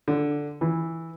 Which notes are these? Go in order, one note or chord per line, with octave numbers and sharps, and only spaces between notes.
D3
E3